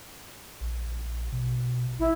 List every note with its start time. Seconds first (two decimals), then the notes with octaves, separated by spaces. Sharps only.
0.61 A#1
1.32 B2
1.99 A1 E4